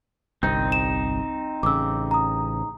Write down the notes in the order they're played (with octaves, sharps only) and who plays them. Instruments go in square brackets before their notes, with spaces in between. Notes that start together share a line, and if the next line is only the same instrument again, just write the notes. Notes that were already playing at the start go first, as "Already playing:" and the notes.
[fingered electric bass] G1 C2 [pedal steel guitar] C4 D#4 [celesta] G6
[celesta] E7
[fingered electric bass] A1 C#3 [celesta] D6 E6
[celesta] A#5 D#6